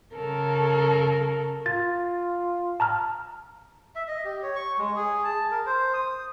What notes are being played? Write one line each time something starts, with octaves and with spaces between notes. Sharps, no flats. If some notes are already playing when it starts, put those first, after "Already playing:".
C#3 A4 A#4
F4 A6
A5 A#5 F6
E5
D#5
G4
C#5
C#6
G#3
G#4
A5
A#4
C5
D#6